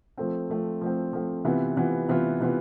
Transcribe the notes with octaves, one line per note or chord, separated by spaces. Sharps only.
F3 A3 C4
F3 A3 C4
F3 A3 C4
F3 A3 C4
C3 E3 B3 F4
C3 E3 B3 F4
C3 E3 B3 F4
C3 E3 B3 F4